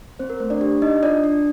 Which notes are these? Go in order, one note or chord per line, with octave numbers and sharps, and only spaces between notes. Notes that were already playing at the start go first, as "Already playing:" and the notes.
C4 C5
A#4
A3 C5
D4 D5
D4 G4 D5
D#4 D#5
D4 F4 D5
D4